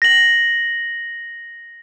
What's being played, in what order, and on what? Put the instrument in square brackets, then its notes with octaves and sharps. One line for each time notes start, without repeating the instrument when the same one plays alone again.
[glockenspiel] A#6 F#7